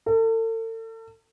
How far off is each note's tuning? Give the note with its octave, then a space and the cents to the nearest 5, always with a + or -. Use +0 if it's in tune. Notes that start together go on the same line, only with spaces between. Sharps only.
A4 +40